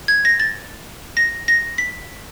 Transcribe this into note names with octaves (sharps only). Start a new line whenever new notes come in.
G#6
A#6
A6
A#6
A#6
B6